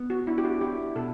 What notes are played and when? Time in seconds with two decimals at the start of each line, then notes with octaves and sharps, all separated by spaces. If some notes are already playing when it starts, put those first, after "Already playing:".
Already playing: B3
0.10 F#4
0.27 D4 E4
0.38 G4
0.45 F#4
0.61 E4 G4
0.95 B2 A4